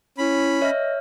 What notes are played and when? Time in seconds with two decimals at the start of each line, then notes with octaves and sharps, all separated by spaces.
0.18 C#4 E4 B5
0.62 C#5 D#5 E5 F6